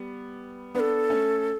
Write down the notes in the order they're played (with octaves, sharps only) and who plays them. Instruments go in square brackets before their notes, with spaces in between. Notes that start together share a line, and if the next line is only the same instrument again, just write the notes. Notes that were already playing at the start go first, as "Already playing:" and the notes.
Already playing: [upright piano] G3 B3
[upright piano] B3 D4 [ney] B4
[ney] A4
[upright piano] A3 C#4